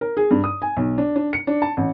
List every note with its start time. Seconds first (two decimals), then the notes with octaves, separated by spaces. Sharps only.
0.01 A#4
0.17 G#4
0.31 G2
0.44 D#6
0.62 G#5
0.77 B1
0.98 D4
1.16 D4
1.33 C#7
1.47 D4
1.62 A5
1.77 A1